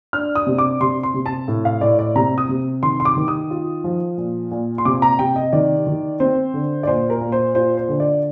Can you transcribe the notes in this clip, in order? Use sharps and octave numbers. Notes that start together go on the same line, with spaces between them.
D4 F6
D#6
C3
D6
C3 C6
C6
C3
A5
A2
F5
A2 D5
D5
C3 A#5
D#6
C3
D#3 C6
C6
D6
D#3
D#6
F4
F3
A#2
A#2
C6
C3 D6
A#5
C3 G5
D#5
D#3 D5
D#3
C4 C5
D3
D5
A#2 C5
A#4
A#2
C5
F4 C5
C5
D3
D5